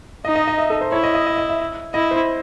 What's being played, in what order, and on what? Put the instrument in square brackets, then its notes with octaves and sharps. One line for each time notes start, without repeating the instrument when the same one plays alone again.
[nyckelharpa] D#4 [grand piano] D#5
[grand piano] D#5
D#5
E5
A4
C5
[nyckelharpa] E4 [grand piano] C#5
[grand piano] D#5
D#5
D#5
D#5
E5
[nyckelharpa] E4 [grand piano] D#5
[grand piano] C5